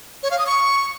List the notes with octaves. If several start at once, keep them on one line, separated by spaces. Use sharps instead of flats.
C#5
F5
D#6
C#6